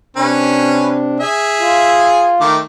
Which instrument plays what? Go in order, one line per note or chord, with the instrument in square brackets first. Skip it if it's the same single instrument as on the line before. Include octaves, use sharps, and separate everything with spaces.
[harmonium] C3 D4 [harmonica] C#4 B4
[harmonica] G#4 E5
[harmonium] F4
[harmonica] D#3 A3 D6